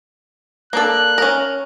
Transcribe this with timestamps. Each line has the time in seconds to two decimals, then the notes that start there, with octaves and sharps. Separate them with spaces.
0.73 A#3 D4 A4 F#6
1.18 C#4 A#4